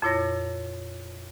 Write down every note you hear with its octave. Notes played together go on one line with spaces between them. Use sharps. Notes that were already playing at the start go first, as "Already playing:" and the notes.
F2 A#2 E4 C#5 A#6